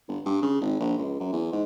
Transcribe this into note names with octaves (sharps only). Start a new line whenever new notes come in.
G1
G2
C#3
G#1
A#1
C#2
F#2
E2
G#2